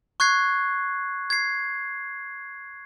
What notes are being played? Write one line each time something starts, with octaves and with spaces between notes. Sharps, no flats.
C#6 F#6 G#6 C7
G#6 C7